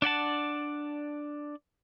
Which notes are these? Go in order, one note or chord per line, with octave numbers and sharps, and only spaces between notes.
D4 D5 F#5 A5